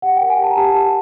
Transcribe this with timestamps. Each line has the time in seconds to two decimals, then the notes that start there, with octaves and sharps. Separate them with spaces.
0.02 G4 F#5
0.17 A#4 G5
0.30 G#5
0.38 G4 A5
0.51 A#5
0.57 G4 A5
0.75 G4